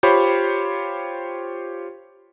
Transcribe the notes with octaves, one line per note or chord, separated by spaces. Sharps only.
F4 G4 C5 C#5 B5 C#6